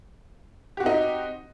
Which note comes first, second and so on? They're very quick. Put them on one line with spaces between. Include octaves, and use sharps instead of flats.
G4 F#4 C4 D#4